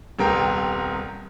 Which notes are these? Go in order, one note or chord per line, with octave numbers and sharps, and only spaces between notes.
D#1 C2 C3 B3 A#4 G5